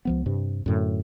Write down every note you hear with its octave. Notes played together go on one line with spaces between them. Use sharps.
C#2 F3 B3
G2 C3
F#2 A2 D3